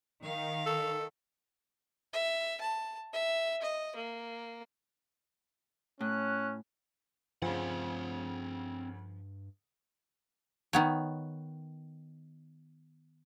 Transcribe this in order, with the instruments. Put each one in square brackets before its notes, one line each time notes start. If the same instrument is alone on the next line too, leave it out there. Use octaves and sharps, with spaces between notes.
[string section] D#3 [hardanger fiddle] F5
[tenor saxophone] A4
[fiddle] E5
A5
E5
D#5
A#3
[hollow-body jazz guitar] A2 [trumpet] C#4 [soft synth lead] F#6
[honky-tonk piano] D2 C#3 [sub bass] G2 [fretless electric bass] F3 [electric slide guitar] C4 F#5
[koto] D#3 B3 C#5